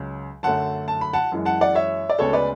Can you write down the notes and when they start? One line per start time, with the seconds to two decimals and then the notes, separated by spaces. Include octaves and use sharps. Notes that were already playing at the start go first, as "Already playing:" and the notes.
Already playing: C#2 C#3 F#3
0.43 F#2 D3 F#3 A3 F#5 A5
0.88 A5
1.01 B5
1.13 F#5 A5
1.32 F#2 E3 G#3
1.45 F#5 A5
1.61 D5 F#5
1.75 C#5 E5
2.10 D5
2.19 D2 C#3 G#3 B3 A4 C#5
2.33 B4 D5